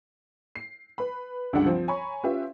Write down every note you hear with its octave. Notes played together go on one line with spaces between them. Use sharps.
C7
B4 B5
C#2 G2 D3 G3 D4 F#5
F3 C4
C#5 G#5 A#5 B5 C#6
C#4 F4 G4 B4 E5